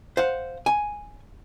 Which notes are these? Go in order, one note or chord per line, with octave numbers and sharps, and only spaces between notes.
C5 F5 F#5
G#5